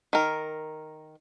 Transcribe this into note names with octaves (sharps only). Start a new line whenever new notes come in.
D#3 A#4